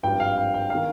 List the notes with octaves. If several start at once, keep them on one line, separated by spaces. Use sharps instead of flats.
G#1 G2 F3 G5
F5
G5
G5
D#3 F5